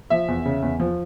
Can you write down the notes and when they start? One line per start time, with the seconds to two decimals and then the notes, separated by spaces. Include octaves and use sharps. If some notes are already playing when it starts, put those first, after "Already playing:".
0.10 F3 E5
0.28 E2
0.45 C#3
0.62 E2
0.80 F3